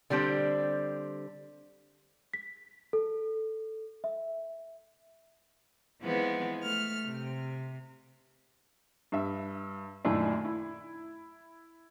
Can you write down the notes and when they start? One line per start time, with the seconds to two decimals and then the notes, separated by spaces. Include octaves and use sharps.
0.10 D3 G3 C4 D4 C5
2.34 B6
2.93 A4
4.04 E5
6.00 E3 F3 G#3 B3 C4
6.64 A3 F6
7.04 C3
9.12 G2 E5
10.05 F#2 A#2 D#3 A3 D4 E4
10.45 E4